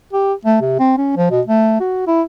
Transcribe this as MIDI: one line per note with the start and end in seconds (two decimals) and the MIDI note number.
0.13 0.34 67
0.45 0.57 57
0.61 0.78 48
0.79 0.94 60
0.97 1.13 61
1.17 1.28 53
1.31 1.41 47
1.47 1.76 57
1.80 2.05 66
2.07 2.22 64